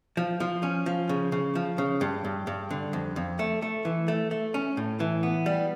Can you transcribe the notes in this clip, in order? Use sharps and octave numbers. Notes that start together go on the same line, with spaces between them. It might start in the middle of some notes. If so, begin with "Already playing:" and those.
F3
F3
C#4
F3
C#3
C#3
F3
C#3
G2
G2
G2
D3
F2
F2
A3
A3
E3
A3
A3
C#4
A2
E3
B3
G3